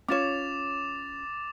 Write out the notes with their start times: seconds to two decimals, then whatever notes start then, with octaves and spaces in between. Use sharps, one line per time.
0.08 C#4 F4 C#5 D6 A6 E7